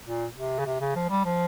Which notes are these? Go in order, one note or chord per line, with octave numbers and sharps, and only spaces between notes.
A#2
C3
C#3
C3
C#3
F3
G3
F3